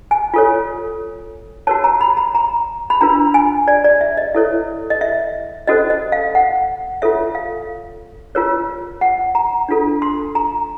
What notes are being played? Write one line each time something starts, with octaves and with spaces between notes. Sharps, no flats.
G#5
F4 A4 C#5
F#4 A#4 C#5 A5
A#5
B5
A#5
A#5
B5
D4 F4 A#4 A#5
G#5
D5
D5
E5
D#5
E4 A4 C#5 E5
D#5
E5
C#4 F#4 A4 C5 D#5
D#5
F5
F#5
F4 A4 C#5 E5
F5
F4 A#4 C#5
F#5
A#5
D4 F4 A4
C6
A#5